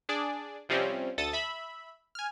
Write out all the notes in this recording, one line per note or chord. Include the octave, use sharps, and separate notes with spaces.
D4 G#4 D5
C3 F3 G3 C4 C#4
D2 A4 D#6 A6
E5 B5
G#5 F6